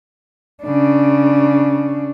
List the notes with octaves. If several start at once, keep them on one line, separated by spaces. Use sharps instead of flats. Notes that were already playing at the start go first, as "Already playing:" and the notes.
C#3 D4